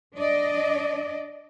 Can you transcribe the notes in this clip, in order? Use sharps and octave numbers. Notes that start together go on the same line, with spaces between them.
D4 D5 D#5